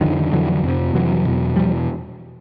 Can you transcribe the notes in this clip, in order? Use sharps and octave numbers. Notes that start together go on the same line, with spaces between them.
F2 D3 D#3 F3
D#3
F2 D3 E3 F#3
F2 C3
F2 C3 E3 F#3
E2 B2
E2 B2 F3 G3